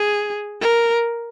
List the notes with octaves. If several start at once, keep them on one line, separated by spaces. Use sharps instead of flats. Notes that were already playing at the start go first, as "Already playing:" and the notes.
Already playing: G#4
A#4